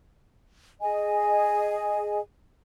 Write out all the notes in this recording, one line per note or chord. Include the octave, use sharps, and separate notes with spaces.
G#4 D#5 G#5